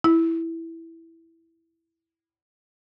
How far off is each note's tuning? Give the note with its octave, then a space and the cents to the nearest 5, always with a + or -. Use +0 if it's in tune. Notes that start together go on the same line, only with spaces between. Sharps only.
E4 +0